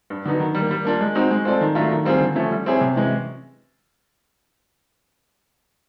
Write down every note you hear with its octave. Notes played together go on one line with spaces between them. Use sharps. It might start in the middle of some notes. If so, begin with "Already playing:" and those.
G2
D3 F#3 B3 D#4
D#3
G3
A#3
G3
A#3 D4 F4
G#3
C4 D#4 F#4
G#3
C4 F4 A4 D5
D#3
F#3 A3 D4 F4
D#3
G3 C4 F4 G#4
D3
F3 A3 C#4
G3
C4 E4 G#4 C#5
C3
E3 G#3 C#4